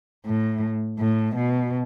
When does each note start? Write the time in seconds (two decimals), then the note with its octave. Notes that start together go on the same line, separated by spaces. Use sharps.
0.26 A2
0.99 A2
1.35 B2